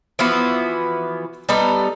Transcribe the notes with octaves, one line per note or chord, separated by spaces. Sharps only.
E3 F3 B3 F#4
G3 B3 D#4 A4